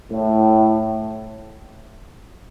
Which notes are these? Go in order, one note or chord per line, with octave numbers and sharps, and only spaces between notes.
A2